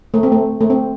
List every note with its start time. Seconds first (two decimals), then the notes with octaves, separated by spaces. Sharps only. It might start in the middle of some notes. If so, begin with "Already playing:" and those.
0.14 A3
0.23 C4
0.32 A3
0.61 A3
0.70 C4